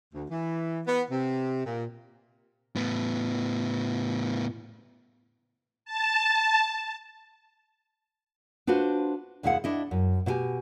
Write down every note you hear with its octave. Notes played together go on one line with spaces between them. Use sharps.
D2
E3
B3
C3
A#2
A2 B3
A5
D4 F4 F#4 B4 C5
D#2 B2 G#3 E4 F5 F#5
D4 E4 D#5
F#2
B2 E4 F#4 G4 G#5